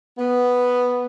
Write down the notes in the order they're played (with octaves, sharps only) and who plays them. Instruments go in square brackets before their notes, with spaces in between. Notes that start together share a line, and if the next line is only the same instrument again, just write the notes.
[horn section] B3